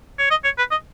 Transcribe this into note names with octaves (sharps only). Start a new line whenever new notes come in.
C#5
D#5
C#5
B4
D#5